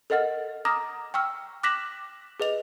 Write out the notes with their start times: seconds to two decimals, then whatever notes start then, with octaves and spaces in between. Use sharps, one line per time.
0.10 A4 A#4 D#5 F#5 F6 A6
0.65 A#5 D6 D#6 F6 A#6
1.14 G5 C#6 E6 F6
1.63 D6 F#6 A#6 B6 E7 F#7
2.40 G#4 B4 D#5 F7